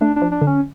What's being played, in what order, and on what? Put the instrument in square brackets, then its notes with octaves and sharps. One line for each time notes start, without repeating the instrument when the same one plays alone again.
[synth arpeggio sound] A3 [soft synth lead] D4
[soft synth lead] D4
[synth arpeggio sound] F3
[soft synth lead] D4
[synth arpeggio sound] D3
[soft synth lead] C#4